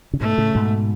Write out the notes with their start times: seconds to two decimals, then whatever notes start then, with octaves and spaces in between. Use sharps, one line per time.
0.13 C#3
0.20 G#2 B2 A3
0.38 A2 C#3
0.55 G#2 B2